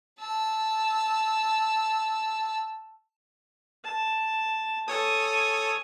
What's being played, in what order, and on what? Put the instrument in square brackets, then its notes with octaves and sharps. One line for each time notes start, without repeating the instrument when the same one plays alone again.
[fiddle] A5 E6
[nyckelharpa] A5
[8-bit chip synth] A4 C#5 D#6 [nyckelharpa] G#5